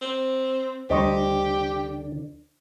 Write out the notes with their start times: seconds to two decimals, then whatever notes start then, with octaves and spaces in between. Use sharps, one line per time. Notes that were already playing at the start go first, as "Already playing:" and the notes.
0.02 C4
0.90 D2 D3 G3 G4 C5 D#5 C#6